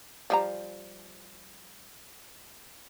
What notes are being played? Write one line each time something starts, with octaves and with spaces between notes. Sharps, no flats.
F3 G3 A#5